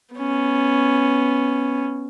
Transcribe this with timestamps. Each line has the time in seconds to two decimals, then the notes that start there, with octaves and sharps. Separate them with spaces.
0.15 B3 C#4